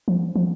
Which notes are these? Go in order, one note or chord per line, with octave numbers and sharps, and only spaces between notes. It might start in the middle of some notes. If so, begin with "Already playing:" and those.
F3
F3